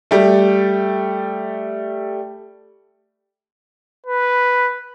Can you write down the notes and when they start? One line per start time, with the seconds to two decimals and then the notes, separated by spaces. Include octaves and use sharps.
0.11 G3 A3
4.06 B4